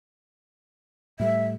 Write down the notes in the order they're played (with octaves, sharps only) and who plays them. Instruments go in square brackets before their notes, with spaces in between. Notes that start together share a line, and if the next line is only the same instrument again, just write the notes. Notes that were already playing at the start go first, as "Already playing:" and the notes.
[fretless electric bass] A2 G3 A3 [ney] E5